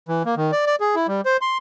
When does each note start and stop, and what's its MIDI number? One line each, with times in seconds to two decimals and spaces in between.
0.08 0.23 52
0.25 0.35 58
0.37 0.51 51
0.52 0.66 74
0.66 0.76 74
0.80 0.95 68
0.95 1.07 64
1.08 1.21 55
1.25 1.37 72
1.41 1.58 84